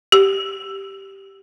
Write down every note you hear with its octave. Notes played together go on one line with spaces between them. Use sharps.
G4